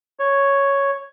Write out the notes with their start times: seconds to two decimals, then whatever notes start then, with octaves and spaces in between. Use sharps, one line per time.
0.19 C#5